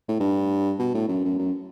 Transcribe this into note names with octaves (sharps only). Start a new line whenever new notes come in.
A2
G2
B2
A2
F#2
F#2
F#2